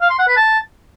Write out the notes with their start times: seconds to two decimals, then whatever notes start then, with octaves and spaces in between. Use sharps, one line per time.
0.01 F5
0.10 C6
0.19 F#5
0.28 B4
0.36 A5